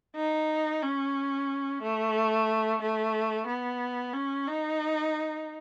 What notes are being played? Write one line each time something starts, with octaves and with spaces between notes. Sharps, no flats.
D#4
C#4
A3
A3
B3
C#4
D#4